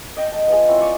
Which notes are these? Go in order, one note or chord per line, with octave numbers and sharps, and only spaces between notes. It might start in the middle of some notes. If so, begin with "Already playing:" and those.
D#5 G5 A5
A5
B3 F4 G#4
C4 E4 F4 C#5
D5 C#6 D#6